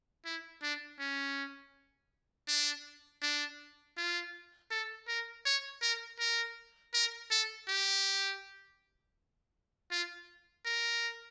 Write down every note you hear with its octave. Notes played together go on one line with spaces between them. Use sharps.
E4
D4
C#4
D4
D4
F4
A4
A#4
C#5
A#4
A#4
A#4
A4
G4
F4
A#4